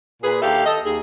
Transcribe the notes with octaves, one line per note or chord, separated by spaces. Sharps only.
A#2 G#4 B4
D#2 D4 G4 A4 E5 F5
A4 D#5
D#2 G#4